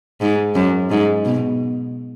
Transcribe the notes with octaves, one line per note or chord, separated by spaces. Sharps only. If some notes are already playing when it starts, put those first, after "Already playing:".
G#2
F#2
G#2
B2